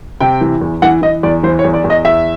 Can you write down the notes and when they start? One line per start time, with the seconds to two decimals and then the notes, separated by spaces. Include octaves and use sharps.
0.20 C3 G5
0.41 E3
0.61 E2
0.82 E3 F#5
1.02 E3 D#5
1.23 E2 D5
1.43 E3 C5
1.59 C#5
1.64 E2
1.74 D5
1.84 E2
1.90 D#5
2.05 E2 E5